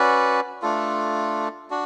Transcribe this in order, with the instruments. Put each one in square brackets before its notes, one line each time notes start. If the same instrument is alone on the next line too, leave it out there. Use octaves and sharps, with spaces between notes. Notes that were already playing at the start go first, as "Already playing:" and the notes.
Already playing: [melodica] C#4 F#4 B4 D5
A3 D4 F4 A4
D4 F#4